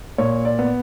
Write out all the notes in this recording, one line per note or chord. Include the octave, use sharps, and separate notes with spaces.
A#2 C#5
D5
B3